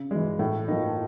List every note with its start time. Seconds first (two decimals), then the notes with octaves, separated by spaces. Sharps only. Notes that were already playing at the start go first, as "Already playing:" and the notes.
Already playing: C#3
0.11 E3 G#3
0.39 A2
0.68 F3 A#3 D#4